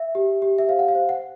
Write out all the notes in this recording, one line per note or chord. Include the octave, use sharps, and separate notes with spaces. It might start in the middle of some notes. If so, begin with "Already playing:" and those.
Already playing: E5
G4
G4
E5
C5 F5
F#5
F5
C5
F#5